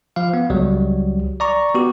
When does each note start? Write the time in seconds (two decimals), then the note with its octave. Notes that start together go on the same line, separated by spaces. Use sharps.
0.16 F3 F5
0.34 B3
0.50 C#2 F#3 G3
1.40 D5 A#5 C#6
1.74 B3 F#4 G4